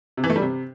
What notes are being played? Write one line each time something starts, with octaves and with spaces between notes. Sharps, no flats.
C3
E3
A3
G3
C3